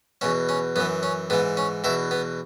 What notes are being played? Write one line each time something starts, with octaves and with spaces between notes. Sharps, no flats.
E2 B2 C#4
C#4
F#2 E3 B3
C#4
G#2 E3 B3
C#4
E2 B2 E4
B3